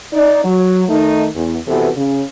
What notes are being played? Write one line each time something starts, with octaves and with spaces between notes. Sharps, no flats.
D#4 D5
F#3
D#3 A3 D#4
E2
E2 C3 E3 B3 F#4 A4
C#3